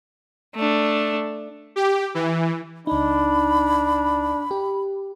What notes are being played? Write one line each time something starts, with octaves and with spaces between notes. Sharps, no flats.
A3 D4
G4
E3
C#2 D4 D#4 B5
G4